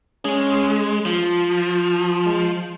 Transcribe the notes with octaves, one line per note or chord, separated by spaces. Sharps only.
G#3 C#4
F3
G#3